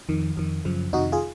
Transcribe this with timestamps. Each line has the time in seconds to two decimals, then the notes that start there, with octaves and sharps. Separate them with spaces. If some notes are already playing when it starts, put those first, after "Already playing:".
0.09 F2 D#3
0.37 F2 D#3
0.65 F#2 C#3 F3
0.93 F2 C3 D#3 D#4 F#4
1.12 F4 G#4